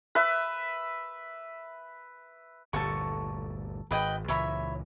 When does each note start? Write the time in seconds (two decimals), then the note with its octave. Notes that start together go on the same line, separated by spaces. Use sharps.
0.15 B4 E5
2.73 G1 D2 A#2 A4 C#6
3.91 G#1 B4 D#5 G5
4.28 C#2 A#2 E3 C#5 E5 B5